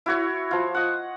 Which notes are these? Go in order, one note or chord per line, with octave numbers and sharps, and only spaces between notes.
E4 F#4 C#5
F3 F4
D#5 F#5